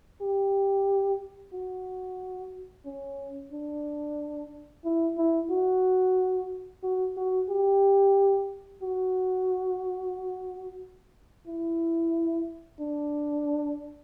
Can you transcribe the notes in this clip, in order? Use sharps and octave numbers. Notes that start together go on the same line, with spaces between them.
G4
F#4
C#4
D4
E4
E4
F#4
F#4
F#4
G4
F#4
E4
D4